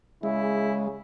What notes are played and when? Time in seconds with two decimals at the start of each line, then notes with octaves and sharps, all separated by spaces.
0.23 C#3 G#3 E4